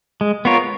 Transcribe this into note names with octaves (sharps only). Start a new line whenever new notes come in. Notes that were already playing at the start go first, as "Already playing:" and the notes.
G#3
B3 F4 A#4 C#5